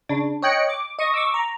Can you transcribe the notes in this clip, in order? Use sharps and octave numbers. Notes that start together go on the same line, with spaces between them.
C#3 D4
C#5 D#5 G5 F#6 C#7
D6
D#5 C#6 D#6
C#6 D6 E6
A#5